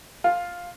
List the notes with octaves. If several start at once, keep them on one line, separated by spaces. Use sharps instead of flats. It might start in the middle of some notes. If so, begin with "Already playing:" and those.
F4